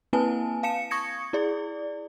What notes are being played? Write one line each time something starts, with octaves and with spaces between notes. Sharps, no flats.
A#3 C4 E4 B4 G#5 A5
F5 A5 C#7 E7
C#6 D#6 G#6 A#6 C#7
E4 G#4 D5